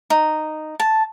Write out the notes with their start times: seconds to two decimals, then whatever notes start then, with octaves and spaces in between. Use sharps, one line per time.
0.10 D#4
0.80 A5